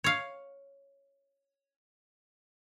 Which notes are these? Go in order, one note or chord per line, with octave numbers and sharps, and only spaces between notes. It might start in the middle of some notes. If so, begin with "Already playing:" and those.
C#5 F5